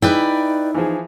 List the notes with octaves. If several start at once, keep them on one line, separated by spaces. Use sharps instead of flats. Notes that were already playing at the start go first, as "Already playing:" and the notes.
D#4 E4 G#4 B4 D5 G5
E3 F3 G#4